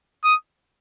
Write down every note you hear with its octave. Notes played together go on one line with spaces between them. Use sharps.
D#6